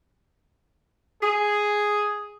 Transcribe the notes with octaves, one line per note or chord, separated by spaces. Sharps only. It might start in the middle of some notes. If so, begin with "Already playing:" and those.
G#4